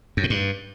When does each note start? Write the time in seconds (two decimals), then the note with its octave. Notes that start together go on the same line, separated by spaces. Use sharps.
0.17 F#2
0.24 A2
0.30 G2